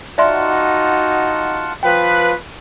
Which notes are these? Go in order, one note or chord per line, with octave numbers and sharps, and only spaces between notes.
D#4 F4 F#4 D5 E5 F#5 A5 C6
F3 B4 G5